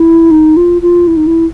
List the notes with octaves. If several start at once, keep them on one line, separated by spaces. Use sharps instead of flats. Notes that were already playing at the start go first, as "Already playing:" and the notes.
Already playing: E4
D#4
F4
F4
E4
D#4
E4